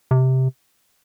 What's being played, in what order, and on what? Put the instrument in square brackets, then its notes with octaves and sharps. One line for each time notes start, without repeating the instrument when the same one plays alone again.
[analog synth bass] C3